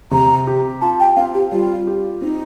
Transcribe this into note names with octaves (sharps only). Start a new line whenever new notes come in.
C3 A#5
G4
F4 A5
G5
C4 F5
G4
G3 F4
G4
C4 D#4